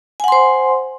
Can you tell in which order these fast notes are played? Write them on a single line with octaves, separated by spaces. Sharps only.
G#5 F#5 C6 C5